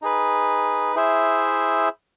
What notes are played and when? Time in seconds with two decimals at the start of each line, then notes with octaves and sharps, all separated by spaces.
0.02 D#4 G#4 B4
0.95 E4 G#4 C5 E5